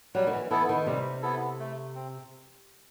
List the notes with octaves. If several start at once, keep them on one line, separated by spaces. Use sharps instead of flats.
F#3 G3
D#3
E3
E3 B3 E4 A4
D#3
C3 G3
B3 E4 A4
A3
C4